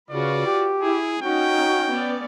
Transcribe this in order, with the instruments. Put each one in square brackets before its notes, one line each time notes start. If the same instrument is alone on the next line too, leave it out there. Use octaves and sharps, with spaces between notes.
[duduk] C#3 [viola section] F4 F#4 B4 [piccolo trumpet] D5
[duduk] G4
[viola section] E4 [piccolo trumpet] G#4
[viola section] C#4 D#4 [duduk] F#4 [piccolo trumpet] G5
[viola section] B3 C#4 D5